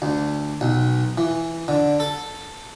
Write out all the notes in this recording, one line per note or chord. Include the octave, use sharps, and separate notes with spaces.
D2
B1
E3
D3
A4